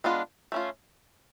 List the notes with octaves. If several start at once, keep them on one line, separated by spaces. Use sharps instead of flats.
G#3 B3 D4 F4
A3 C#4 F4